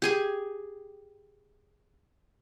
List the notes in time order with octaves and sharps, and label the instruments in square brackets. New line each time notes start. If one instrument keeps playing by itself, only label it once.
[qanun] G4 G#4 G#5